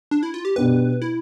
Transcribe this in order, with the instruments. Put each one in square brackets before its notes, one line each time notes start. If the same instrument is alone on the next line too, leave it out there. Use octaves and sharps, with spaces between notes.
[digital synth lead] D4
E4
F4
G4
[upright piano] B2 B3 D4 G4 [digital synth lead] B4
[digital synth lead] E4